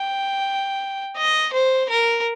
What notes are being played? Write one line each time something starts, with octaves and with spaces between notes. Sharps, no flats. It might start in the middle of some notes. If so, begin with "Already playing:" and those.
Already playing: G5
D#5
C5
A#4